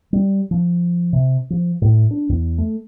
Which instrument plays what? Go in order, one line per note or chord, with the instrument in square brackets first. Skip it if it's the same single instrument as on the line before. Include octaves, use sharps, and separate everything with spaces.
[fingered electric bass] G3
F3
C3
F3
A2
D4
E2
A3